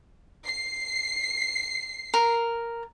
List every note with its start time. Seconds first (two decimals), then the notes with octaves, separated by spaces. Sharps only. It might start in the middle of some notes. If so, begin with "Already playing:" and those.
0.45 C7
2.14 A#4